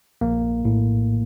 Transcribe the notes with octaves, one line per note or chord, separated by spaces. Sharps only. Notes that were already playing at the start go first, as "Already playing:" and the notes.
A#1 A#3
A2